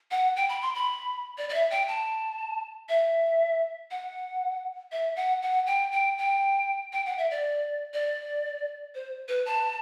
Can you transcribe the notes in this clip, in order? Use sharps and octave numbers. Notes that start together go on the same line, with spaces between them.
F#5
G5
B5
C6
B5
D5
D5
E5
G5
A5
E5
F#5
E5
F#5
F#5
G5
G5
G5
G5
F#5
E5
D5
D5
C5
B4
A5